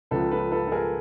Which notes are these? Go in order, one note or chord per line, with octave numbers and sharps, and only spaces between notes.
C#2 C#3 F3 A4 B4
A4 B4
A4 B4
A4
G#4 A#4